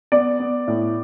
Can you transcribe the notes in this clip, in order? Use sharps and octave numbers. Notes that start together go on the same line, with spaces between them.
B3 D5
B3
A2